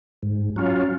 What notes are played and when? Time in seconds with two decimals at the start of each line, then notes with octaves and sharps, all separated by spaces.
0.23 G#2
0.56 F#3 C#4 F4